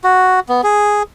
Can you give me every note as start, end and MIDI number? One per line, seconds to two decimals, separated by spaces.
0.04 0.40 66
0.49 0.61 59
0.64 1.03 68